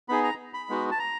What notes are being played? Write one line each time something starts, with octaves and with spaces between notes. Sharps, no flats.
B3 D#4 G#4 B5
A#5
B5
G#3 B3 D#4 F#4
A5
A#5